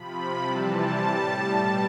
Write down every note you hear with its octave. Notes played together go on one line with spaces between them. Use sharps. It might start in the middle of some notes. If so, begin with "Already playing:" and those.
Already playing: C3 F3 B5
C3 E3 G3 A5
A2 G3
B2 G3